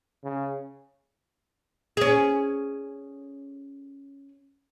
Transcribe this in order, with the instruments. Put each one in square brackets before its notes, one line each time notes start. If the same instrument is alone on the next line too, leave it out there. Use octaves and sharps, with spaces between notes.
[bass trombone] C#3
[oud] C#4 G#4